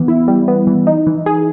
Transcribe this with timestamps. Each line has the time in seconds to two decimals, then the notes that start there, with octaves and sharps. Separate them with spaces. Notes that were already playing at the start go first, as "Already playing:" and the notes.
Already playing: E3 B3
0.08 E4
0.28 G3
0.48 B3
0.67 E3
0.87 D#4
1.07 E3
1.26 G#4